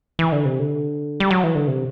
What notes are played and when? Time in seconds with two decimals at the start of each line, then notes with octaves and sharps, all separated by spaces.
0.19 E3
0.32 D3
0.45 C3
0.60 D3
1.20 G3
1.31 F#3
1.44 E3
1.55 D3
1.68 C3